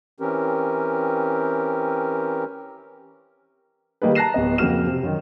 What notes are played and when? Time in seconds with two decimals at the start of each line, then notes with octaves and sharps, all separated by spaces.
0.20 E3 C4 C#4 G4 A#4
4.02 D#3 G3 A#3 D#4 G#4 B4
4.15 A5 A#5 F#6 A#6 C7 E7
4.34 D1 B3 D#5
4.58 F2 C#3 A#3 F#4 F6 E7
4.87 C3
5.03 F#2 D#3